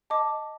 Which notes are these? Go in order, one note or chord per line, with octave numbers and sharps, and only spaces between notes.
D#5 A5 D6